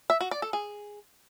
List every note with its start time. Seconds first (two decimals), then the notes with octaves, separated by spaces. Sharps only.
0.10 E5
0.21 F#4
0.31 D5
0.42 A4
0.53 G#4